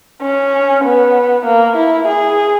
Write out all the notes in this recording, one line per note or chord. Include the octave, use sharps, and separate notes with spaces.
C#4
B3
A#3
E4
G#4